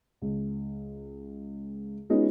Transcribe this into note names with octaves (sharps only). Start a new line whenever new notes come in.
C#2
G#3 B3 C#4 D#4 F4 F#4